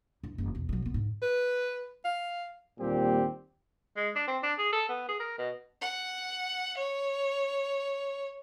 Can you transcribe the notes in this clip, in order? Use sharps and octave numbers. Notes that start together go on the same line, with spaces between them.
G2 E4
F#1 E3
B1 E2
B1 F#3
C2 B3
G#2 D3
B4
F5
D#2 A#2 G3 C4 G4
G#3
D4
C4
D4
G#4
A4
B3
G#4
A#4
B2
F#5
C#5